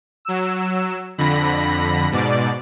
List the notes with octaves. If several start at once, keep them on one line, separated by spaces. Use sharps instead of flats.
F#3 E6
F2 D3 B5 A#6
G#2 B2 D5